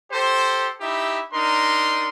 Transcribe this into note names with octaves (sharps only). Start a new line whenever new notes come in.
G4 A4 C5
D#4 E4 G4 E5
D4 D#4 A#4 C6